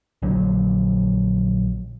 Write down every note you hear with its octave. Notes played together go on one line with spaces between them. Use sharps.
A#1 D3 F#3